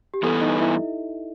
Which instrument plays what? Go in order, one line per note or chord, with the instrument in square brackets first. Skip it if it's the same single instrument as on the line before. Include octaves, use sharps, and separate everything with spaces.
[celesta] G4
[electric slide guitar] G2 E3 B3 [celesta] A4
[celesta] D#4 D#5
E4 E5